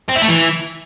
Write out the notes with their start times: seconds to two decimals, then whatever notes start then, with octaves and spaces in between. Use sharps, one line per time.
0.09 C4
0.16 E4
0.22 A3
0.28 E3